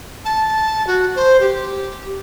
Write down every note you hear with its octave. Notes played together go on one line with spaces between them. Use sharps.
A5
F#4
C5
G4